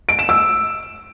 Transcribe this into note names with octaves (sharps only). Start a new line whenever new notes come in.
D7
E7
E6